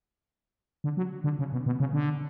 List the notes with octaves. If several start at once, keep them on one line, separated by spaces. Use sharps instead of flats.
D3
F#3
D3
C#3
B2
B2
C#3
D3